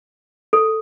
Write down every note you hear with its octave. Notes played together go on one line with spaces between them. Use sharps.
A4